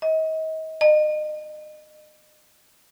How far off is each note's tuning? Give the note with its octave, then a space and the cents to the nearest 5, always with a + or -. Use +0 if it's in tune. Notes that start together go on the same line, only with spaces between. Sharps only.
D#5 +35
D#5 -35